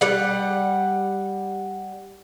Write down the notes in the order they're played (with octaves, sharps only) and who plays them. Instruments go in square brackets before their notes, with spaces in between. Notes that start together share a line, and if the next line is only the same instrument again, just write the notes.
[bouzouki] G3 F#5